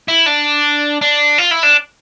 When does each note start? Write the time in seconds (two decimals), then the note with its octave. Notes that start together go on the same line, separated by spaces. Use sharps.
0.08 E4
0.26 D4
1.01 D4
1.38 F4
1.51 E4
1.63 D4